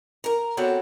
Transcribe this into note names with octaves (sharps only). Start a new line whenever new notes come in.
A#4 A#5
B3 C4 F#4 A4 C#5 D5